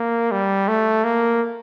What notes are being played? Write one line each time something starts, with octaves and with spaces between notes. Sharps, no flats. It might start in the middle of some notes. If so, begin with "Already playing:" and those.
Already playing: A#3
G3
A3
A#3